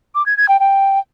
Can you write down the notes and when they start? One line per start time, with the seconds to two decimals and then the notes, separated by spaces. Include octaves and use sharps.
0.15 D6
0.26 G#6
0.37 G#6
0.49 G5
0.60 G5